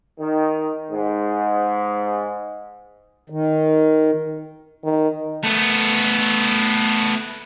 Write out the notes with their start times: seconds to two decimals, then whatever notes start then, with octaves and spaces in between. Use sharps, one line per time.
0.19 D#3
0.91 G#2
3.30 D#3
4.84 D#3
5.44 A3 B3